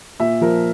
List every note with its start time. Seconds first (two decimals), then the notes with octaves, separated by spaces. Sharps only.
0.20 A#2 E5
0.41 F3 A#4